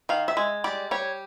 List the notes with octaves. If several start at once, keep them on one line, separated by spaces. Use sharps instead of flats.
D#3 F5
E5
G#3
G3 D5
G3 C#5